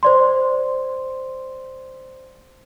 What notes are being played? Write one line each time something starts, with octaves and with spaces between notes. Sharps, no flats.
C5 D5 C6